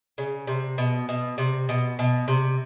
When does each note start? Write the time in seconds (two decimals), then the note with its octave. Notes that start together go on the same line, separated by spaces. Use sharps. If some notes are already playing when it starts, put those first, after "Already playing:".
0.18 C#3
0.47 C3
0.78 B2
1.09 B2
1.38 C3
1.69 B2
1.99 B2
2.28 C3